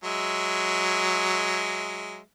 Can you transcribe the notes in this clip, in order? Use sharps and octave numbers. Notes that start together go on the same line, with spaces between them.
F#3 G#3 E5